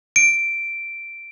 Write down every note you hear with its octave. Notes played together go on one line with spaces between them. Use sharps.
D7